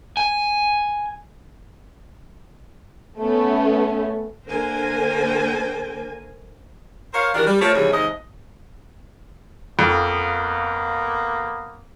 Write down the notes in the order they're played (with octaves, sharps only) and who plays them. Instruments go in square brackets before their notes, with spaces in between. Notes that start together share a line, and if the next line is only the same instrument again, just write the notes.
[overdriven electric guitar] G#5
[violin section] A3 B3 C#4
[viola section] D3 A#3 A#4 C5 G#5
[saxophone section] A#4 C5 C#5 F5
D#3 E3 D4 F#4 G4 A#4
G3
F3 A3 F4 A#4 C#5
D#2 C3 E3 G3 G#4 C#5
D#2 G#2 C3 D#5
[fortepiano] F2 [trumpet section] A#3 B3